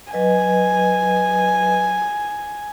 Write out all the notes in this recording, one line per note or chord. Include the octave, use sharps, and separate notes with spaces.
F#3 B4 D#5 G#5